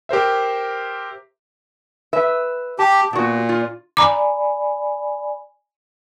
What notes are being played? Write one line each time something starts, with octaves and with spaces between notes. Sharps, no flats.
G4 A#4 C5 E5
B4 E5
G4 A5
A#2 B3 F#4
F4
D5 G#5 A#5 B5 D6